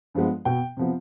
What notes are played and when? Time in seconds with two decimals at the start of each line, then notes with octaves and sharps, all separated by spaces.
0.14 G2 F3 G#3 B3
0.45 B2 B3 G5
0.77 C3 F3 B3